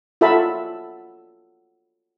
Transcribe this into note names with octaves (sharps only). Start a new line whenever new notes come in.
F4 F#4 A4 E5 A5 B5